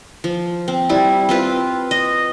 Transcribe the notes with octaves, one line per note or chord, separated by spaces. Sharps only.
F3
C4
G3 E4
C4 F4 B4
D#5